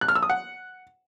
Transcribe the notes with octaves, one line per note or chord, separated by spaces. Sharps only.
F#6
F6
E6
D#6
F#5